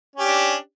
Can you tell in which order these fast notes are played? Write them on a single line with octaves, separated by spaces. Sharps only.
C#4 G4 D4